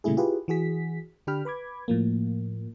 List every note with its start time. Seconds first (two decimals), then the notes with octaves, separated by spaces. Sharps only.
0.04 A#2 C#3 G3 A3 E4 G#4
0.17 E4 F4 G4 G#4 B4
0.48 E3 F#4 G#4 B6
1.27 D3 D4 G4 G5 B5 F6
1.45 B4 B5 D6 G#6
1.88 A2 F3 A#3